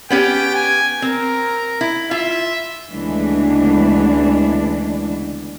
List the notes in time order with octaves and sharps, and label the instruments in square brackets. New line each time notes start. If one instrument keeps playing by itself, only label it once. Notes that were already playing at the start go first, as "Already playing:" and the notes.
[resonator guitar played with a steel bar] B3 C#4 G4 [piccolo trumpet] G5
[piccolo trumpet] G#5
[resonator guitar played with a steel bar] C4 [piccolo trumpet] A#4
[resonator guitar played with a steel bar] E4
[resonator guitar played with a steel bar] F4 [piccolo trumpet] E5
[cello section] D2 C#3 E3 G#3 B3 D4